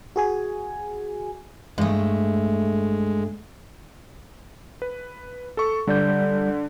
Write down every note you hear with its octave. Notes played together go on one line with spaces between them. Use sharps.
F#4 G#4 G#5
G2 G#3 A3
B4
A4 C#6
D3 G3 D5 G6